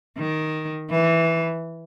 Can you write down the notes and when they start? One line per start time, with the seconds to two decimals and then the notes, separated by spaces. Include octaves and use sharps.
0.18 D#3
0.90 E3